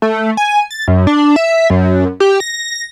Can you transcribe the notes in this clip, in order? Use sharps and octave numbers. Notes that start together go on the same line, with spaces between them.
A3
G#5
A6
F#2
D4
E5
F#2
G4
A#6